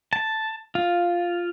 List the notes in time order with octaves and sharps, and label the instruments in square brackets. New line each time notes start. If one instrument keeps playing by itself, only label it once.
[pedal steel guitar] A5
F4